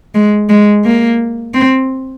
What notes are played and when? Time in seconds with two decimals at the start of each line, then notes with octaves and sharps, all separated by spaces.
0.15 G#3
0.50 G#3
0.85 A#3
1.55 C4